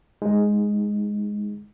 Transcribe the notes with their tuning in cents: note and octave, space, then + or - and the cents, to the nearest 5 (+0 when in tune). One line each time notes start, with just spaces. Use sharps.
G#3 +0 D#4 +0